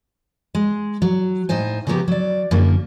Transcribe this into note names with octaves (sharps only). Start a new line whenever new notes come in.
G#3
F#3
A2 D#4 C5 G#5
C#3 F3 F#3 A#3 B3 G4
F#3 D5
F#2 D3 A#3